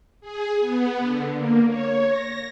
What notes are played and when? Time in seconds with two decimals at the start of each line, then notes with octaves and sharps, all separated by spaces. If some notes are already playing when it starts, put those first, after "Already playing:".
0.21 G#4
0.60 B3
1.00 D3
1.34 A#3
1.67 C#5
2.06 A#6